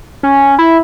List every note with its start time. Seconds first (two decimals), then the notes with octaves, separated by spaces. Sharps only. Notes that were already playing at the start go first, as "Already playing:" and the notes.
0.23 C#4
0.59 E4